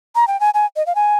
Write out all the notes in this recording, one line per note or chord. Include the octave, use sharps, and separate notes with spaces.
A#5
G5
G#5
G#5
D#5
F5
G#5